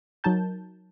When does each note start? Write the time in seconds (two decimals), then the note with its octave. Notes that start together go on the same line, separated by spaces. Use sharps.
0.24 F#3 D#4 A#4 A5 G6